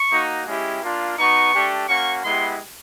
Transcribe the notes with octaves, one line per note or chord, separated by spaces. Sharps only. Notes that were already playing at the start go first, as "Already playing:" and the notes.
Already playing: C#6
A#3 D#4 F#4
G#3 C#4 E4 G4
A#3 D4 F4
B3 D#4 F#4 C#6
A3 D4 G4
A#3 C#4 F#4 C#6
G#3 B3 E4 G4 C6